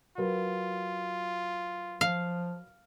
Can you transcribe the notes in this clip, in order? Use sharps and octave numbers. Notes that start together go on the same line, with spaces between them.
F#3 F4 A#4 B4
F3 F5